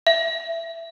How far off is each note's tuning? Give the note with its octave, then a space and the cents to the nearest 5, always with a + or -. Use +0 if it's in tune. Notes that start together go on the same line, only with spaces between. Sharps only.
E5 +15